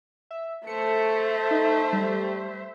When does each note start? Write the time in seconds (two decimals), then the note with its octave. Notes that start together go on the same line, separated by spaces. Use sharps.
0.31 E5
0.67 A3 C5 E5 C#7
1.51 D#4
1.93 G3